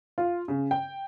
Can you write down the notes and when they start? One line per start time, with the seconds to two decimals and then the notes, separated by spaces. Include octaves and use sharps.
0.18 F4
0.48 C#3
0.71 G5